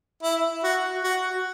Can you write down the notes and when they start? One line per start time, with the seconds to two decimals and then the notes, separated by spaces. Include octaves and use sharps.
0.23 E4
0.64 F#4
1.04 F#4